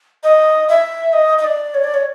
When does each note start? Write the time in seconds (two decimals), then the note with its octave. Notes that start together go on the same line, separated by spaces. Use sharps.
0.23 D#5
0.69 E5
1.13 D#5
1.38 D#5
1.44 D5
1.74 C#5
1.84 D5
1.94 C#5